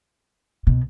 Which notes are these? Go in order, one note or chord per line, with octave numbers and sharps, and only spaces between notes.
B2